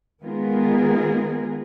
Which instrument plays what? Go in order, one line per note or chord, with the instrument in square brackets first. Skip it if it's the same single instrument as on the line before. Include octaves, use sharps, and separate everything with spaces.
[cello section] D#3 G#3 B3 F4 G#4 A#4